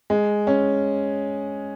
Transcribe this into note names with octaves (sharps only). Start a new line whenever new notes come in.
G#3
C#4